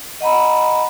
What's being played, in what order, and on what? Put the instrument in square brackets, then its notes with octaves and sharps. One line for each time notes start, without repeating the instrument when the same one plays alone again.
[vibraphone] D#5 F#5 A#5 B5